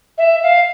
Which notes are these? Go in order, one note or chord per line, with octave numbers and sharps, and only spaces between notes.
E5
F5